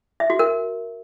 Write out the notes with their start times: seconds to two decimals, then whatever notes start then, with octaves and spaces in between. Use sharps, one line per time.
0.20 E5
0.30 F#4
0.39 A#4